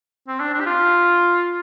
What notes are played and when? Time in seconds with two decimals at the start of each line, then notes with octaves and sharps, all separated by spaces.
0.28 C4
0.40 D4
0.54 D4
0.60 G4
0.66 F4